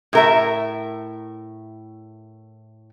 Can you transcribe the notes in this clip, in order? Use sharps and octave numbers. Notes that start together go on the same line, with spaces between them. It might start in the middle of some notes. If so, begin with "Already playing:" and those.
A2 A#4 E5